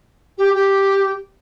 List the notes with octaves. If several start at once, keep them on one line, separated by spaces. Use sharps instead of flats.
G4
G4